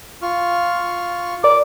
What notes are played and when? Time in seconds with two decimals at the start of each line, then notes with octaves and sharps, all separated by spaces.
0.22 F4 C#6 F6
1.44 A#4 D5 D6